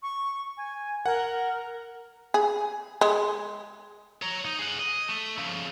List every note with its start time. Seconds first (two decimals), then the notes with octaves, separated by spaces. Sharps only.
0.03 C#6
0.57 G#5
1.06 A#4 F#5
2.34 G#4
3.01 G#3
4.22 C#5 A#5
4.45 D#4
4.59 G#4 F#5
4.79 D#5
5.08 A3
5.38 C#3 F3